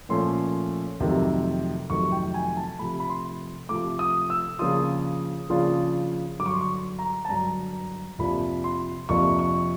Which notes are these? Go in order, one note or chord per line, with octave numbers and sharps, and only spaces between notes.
A#2 F3 A3 C#4 C6
F2 C3 D#3 F#3 A3
F2 C3 D#3 F#3 A3 C#6
G5
G#5
A5
C3 F3 A3 B5
B5
C6
C3 F3 A3 D6
D#6
E6
C#3 F3 A#3 D4 F4 D#6
C#3 F3 A#3 D4 F4
G2 D3 F#3 D6
C#6
C6
C#6
A#5
A5
G2 D3 F#3 A#5
F2 C3 F3 A#3 D4 B5
C6
F2 C3 F3 A#3 D4 C#6
C#6